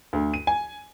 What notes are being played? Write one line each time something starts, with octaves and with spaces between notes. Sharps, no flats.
D2
D#7
G#5